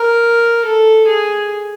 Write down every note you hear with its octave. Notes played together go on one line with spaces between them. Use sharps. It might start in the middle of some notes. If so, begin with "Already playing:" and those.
Already playing: A#4
A4
G#4